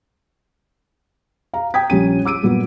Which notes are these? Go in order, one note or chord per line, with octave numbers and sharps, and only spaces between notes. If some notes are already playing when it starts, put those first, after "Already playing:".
F5 A#5
G5 A#5 D#6 G#6 B6
A#1 G3 C#4 D#7
D6 E6 D7 D#7
G2 A#2 F#3 B3